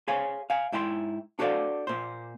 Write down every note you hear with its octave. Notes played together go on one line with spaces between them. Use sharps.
G#4 C5 C#5 F5 G#5
F5 G#5
G#2 E4 G5 A#5 C6
D4 F#4 A4 C5 D5 F5
A#2 C5